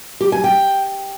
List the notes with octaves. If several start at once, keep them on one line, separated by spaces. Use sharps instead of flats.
G4
G#5
G5